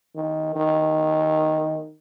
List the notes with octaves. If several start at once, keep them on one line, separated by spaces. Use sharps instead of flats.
D#3
D#3